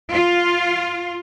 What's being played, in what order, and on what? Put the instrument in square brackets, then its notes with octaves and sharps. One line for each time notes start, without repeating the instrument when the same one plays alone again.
[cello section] F4